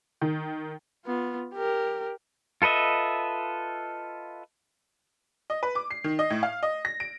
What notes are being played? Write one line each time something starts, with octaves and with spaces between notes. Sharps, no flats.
D#3
B3 F4
G4 A#4
F4 A4 B4 D#5 E5
D#5
B4
D6
C7
D#3
D#5
A2
F5
D#5
A#6
D7